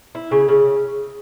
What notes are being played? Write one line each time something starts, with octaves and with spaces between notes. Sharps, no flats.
E4
C#3
C#3